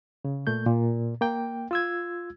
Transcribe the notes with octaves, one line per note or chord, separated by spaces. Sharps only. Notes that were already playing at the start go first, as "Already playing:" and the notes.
C#3
A#2 A3 G6
A#2
A#3 G5
F4 E6 G#6